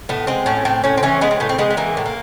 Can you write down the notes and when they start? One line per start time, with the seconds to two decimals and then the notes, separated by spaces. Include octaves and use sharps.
0.09 A2 B3
0.27 G#3 C4
0.46 A2 C#4
0.65 A2 C4
0.84 A2 C#4
0.97 C4
1.03 E3 C#4
1.21 G#3 B3
1.31 C4
1.40 A2 B3
1.49 C4
1.58 G#3 B3
1.70 B3
1.77 E3 A#3
1.97 A2
2.06 A#3